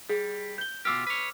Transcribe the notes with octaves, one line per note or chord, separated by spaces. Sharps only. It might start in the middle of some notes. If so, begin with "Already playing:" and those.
G3 G#4
G6 G7
B2 F4 G4 D6 E6 F6
B4 C#5